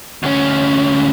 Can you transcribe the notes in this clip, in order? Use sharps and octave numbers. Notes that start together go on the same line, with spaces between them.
D2 C#4